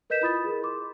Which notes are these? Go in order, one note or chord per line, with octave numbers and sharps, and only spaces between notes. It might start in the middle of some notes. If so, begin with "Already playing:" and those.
A#4 B4 D#5 G6 B6 E7
E4 F4 B5 D#6 A6
G#4 A#4
C6 D6